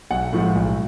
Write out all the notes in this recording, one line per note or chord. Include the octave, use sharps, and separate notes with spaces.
B1 F#5
A2 F3 G#3
B1